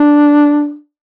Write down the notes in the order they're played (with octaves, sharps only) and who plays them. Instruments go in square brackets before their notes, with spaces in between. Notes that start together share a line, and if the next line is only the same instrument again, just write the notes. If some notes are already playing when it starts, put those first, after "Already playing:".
Already playing: [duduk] D4